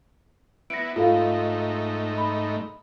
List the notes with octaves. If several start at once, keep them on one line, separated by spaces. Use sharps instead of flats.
B3 E4 A#6 C#7 D7
G#2 A3 D#4 F4 A4 F5
B5